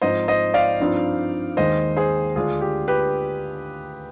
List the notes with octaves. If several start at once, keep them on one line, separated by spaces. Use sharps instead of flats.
G#2 F3 C4 D#4 C5 D#5
C5 D#5
D5 F5
G2 F3 C4 D#4
D#2 D#3 G#3 C5 D#5
G#4 C5
D2 D3 G#3 D4 F4 G#4
G4
G4 B4